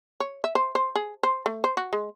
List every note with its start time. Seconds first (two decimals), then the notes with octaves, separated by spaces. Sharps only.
0.20 C#5
0.44 E5
0.55 C5
0.75 C5
0.95 G#4
1.23 C5
1.46 A3
1.64 C5
1.77 F#4
1.93 G#3